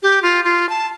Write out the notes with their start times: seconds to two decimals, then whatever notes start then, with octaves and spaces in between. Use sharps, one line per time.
0.03 G4
0.23 F4
0.44 F4
0.69 A5